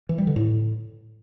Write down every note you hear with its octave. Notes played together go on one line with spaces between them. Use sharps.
E3
G3
D3
A2